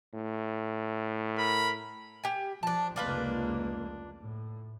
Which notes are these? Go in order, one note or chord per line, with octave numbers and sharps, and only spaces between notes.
A2
A#4 B5
G4 G#5
F3 D4 A5
F1 C#2 A#3 D4 F4 B4
A2